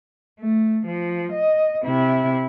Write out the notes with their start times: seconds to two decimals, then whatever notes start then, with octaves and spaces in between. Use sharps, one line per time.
0.40 A3
0.87 F3
1.33 D#5
1.84 C3 E4